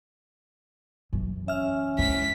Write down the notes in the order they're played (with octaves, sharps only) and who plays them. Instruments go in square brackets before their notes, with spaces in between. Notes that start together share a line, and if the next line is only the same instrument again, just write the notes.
[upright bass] F#2 E3
[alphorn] C#4 [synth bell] E5 F6
[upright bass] G#3 E4 [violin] B6